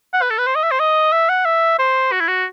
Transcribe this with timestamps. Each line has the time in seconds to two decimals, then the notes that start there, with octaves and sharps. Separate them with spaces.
0.13 F#5
0.22 B4
0.30 A4
0.38 B4
0.47 C5
0.55 D#5
0.63 E5
0.71 C5
0.80 D#5
1.12 E5
1.29 F#5
1.45 E5
1.79 C5
2.12 F#4
2.20 E4
2.28 F#4